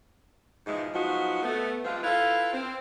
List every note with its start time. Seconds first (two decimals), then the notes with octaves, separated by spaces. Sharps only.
0.67 G#2 B2 E3 F3 G#3
0.94 F3 F#3 G#3 B3 D#4 F#4
1.43 A3 B3
1.84 F3 G3 G#3 C4 F4
2.03 E4 F4 A4 B4 F5
2.53 C4